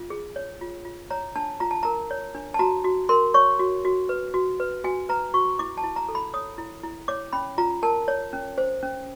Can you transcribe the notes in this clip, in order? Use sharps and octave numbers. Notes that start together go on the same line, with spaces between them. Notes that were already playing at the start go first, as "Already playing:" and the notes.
Already playing: F4
G#4
C#5
F4
F4
C#5 A#5
D4 A5
F4 A#5
A5
A#4 A#5
C#5
D4
A5
F#4 A#5
F#4
A#4 C6
C#5 C#6
F#4
F#4
B4
F#4
B4
F#4 G#5
B4 A#5
F#4 C#6
E4 D6
A5
E4
A#5
A4
B5
C#5 D#6
E4
E4
C#5 D6
C#4 B5
F4 A#5
A#4 A5
C#5
C#4
C5
C#4